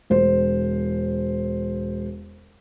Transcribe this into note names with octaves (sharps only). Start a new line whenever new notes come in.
E1 C5